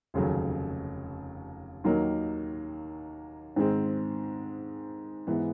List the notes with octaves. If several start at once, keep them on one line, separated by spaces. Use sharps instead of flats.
F1 D#2 C#3 F#3
D#2 D#3 F#3 A#3 D#4
G#2 D#3 G#3 C4
G#2 E3 G#3 B3